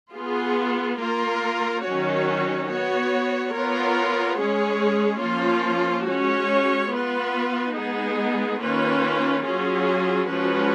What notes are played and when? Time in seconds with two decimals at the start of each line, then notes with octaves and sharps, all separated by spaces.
0.15 B3 F4 G#4
1.00 A#3 F4 A#4
1.85 D#3 F#3 C#4 F#4 C#5
2.69 B3 F#4 C#5
3.53 B3 F4 A#4 C#5
4.38 G#3 C#4 G#4 C#5
5.22 F3 A#3 C#4 F4
6.07 G#3 C#4 F#4 C#5
6.91 B3 F4 B4
7.76 G#3 B3 D#4 G#4
8.61 D#3 A#3 C#4 F4 B4
9.45 F#3 C#4 F4 G#4
10.30 F3 G#3 C#4 F#4 B4